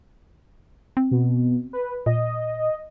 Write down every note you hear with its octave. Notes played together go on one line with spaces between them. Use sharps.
C4
B2
B4
A#2 D#5